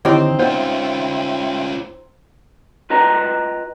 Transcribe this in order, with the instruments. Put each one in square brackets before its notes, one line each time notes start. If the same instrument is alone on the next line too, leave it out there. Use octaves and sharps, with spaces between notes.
[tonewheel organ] D3 D#3 [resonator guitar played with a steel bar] C4 D#4 [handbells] E4 G4 C#5
[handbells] B3 C5 [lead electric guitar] C#4 F4 [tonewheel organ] E5 G5 C6
[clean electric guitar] F4 B4 D#5 G5 A#5